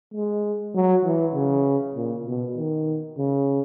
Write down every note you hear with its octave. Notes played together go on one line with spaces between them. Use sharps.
G#3
F#3
E3
C#3
A#2
B2
D#3
C#3